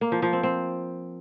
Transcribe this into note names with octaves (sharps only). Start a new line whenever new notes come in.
A#3
F3
F3
C4
C4